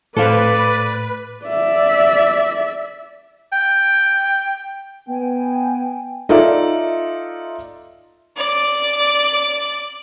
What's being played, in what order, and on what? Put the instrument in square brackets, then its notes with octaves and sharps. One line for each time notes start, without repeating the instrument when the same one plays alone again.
[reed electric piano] A2 [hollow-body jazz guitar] A4 C5 F5 [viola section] B4 [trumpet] D5
[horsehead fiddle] D5 E5
[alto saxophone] G5
[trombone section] B3 [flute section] G5 G#5
[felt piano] D#4 F4 A4 D5 E5
[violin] D5 D6